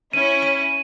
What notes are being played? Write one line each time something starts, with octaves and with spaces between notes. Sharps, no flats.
C#4 E4 D#7
D#7